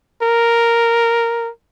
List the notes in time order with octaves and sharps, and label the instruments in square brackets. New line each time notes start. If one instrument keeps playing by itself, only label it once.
[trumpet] A#4